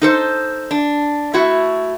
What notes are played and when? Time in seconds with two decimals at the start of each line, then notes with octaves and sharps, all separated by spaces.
0.02 D#4 A4 C5
0.71 D4
1.33 A3 E4 F#4